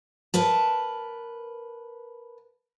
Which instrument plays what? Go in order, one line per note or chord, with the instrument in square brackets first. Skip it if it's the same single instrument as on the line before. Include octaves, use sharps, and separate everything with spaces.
[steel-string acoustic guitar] A#4 B4 A5